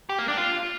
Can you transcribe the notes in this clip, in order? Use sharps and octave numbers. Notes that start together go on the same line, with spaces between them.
G4
A#3
D4
F4